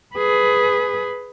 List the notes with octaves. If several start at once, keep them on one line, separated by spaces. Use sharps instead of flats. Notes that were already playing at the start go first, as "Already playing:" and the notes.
G#4 B4